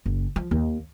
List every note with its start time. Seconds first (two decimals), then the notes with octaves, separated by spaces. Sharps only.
0.06 F#1
0.36 F3
0.51 D#2